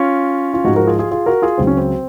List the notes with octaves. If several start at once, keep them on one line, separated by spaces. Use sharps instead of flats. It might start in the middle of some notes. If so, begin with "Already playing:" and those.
Already playing: C#4 F4
F4
G#2 F3 D#4 F#4
F#4 A#4
F4 G#4
F4 G#4
F4 G#4
F#4 A#4
F4 G#4
C#2 C#3 F#3 C4
C#4
C4